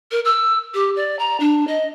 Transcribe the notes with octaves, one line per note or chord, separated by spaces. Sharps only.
A#4
E6
G4
D5
A#5
D4
D#5